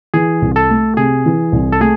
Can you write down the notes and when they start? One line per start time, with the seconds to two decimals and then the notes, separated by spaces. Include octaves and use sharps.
0.14 E3 G#4
0.42 C2
0.56 A4
0.70 A3
0.97 C3 G#4
1.26 E3
1.52 C2
1.72 A4
1.80 A3 G#4